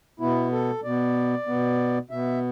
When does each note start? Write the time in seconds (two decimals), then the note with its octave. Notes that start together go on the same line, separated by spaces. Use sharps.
0.20 B2 B3 E4
0.52 A4
0.84 B2 B3 D5
1.47 B2 B3
2.10 B2 B3 E5